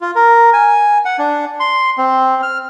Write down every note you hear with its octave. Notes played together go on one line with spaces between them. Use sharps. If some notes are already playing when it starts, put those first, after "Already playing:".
F4
A#4
G#5
F#5
D4
C6
C4
F6